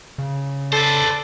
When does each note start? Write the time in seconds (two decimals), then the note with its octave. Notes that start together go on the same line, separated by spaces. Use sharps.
0.18 C#3
0.73 A4 B4 C5 D5